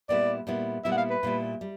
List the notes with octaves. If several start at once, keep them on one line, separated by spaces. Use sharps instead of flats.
A#2 G3 B3 E4 D5
A#2 G3 B3 E4
A#2 G3 B3 E4 E5
F#5
F5
B4
A#2 G3 B3 E4
G3